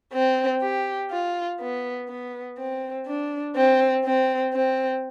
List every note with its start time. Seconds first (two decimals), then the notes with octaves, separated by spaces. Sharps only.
0.13 C4
0.61 G4
1.11 F4
1.60 B3
2.08 B3
2.58 C4
3.06 D4
3.56 C4
4.05 C4
4.53 C4